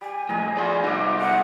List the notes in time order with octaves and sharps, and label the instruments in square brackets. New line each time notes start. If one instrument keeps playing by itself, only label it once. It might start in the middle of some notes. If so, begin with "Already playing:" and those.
[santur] G3 [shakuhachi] G#5
[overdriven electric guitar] F2 A2 [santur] G#4 D#5 A#5
[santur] F4 C5 [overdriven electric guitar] G#4 D5
[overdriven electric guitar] C2 D#4 [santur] F4 E5 D6
[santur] G#4 F5 [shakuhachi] F#5